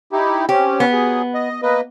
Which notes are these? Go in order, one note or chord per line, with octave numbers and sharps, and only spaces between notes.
D#4 E4 G4
C4 C#4 G4
B3
F#3 G#4
D#5
A#3 B4 D#5